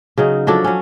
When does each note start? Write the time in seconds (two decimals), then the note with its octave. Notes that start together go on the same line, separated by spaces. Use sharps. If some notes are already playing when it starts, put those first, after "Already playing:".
0.17 C#3 F#3 D#4
0.47 F3 F#3 D4 A4
0.64 F#3 C#4